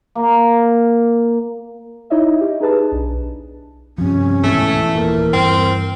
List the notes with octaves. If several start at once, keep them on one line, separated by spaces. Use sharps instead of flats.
A#3
D#4 E4 C#5 D#5 E5
G4
D#4 G#4 B4 A5
B1 D4
G2 C3 F3 C#4
D1 G#2 B2 E3 A3
D#1 A#2 A#4
G2 C4